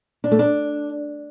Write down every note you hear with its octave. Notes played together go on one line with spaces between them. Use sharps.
D4
A3
D4